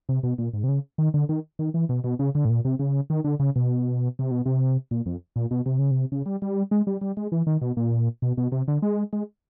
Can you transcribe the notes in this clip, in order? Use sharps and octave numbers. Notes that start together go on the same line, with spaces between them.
C3
B2
A#2
G#2
C3
C#3
D#3
D3
D#3
D#3
E3
B2
B2
C#3
D3
A2
A#2
C3
C#3
D#3
D3
C#3
B2
C3
B2
C3
A#2
F2
A#2
B2
C3
C#3
C3
C#3
G3
G3
G#3
G3
G3
G#3
E3
D#3
B2
A#2
B2
B2
C3
D3
G#3
G#3